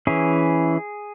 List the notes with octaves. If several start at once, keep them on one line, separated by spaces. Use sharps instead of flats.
E3 C#4 E4 G#4